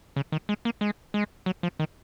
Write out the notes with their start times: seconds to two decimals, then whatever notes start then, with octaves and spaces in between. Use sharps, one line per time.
0.16 C#3
0.32 D#3
0.49 G#3
0.65 A#3
0.81 G#3
1.14 G#3
1.46 F#3
1.63 F3
1.79 D#3